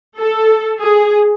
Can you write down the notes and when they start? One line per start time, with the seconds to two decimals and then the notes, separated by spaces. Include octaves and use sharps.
0.19 A4
0.80 G#4